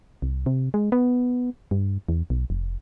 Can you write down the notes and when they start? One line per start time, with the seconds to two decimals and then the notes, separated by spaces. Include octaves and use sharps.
0.22 C2
0.46 C3
0.74 G#3
0.92 B3
1.71 G2
2.09 E2
2.30 B1
2.50 F1